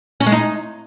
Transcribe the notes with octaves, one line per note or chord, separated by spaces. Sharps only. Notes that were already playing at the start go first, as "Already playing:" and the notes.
C#4
G#3
D#4